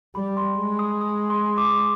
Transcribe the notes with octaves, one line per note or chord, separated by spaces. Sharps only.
G3 B5
C6
G#3
D#6
D#6
C6
D6